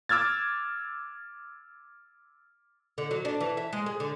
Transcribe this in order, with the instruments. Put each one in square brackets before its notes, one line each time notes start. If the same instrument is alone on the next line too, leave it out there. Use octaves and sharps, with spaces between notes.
[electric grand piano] D6 E6 F6 G#6 A6
[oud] D3
F#3
D4
E3
E5
G#3
G#4
D3